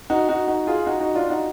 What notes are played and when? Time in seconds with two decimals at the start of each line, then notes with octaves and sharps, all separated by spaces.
0.10 D#4 F#4
0.29 D#4 F#4
0.48 D#4 F#4
0.67 F4 G#4
0.86 D#4 F#4
1.00 D#4 F#4
1.15 D4 F4
1.30 D#4 F#4